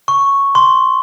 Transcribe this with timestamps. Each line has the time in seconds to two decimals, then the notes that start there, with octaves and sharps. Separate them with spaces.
0.08 C#6
0.55 C6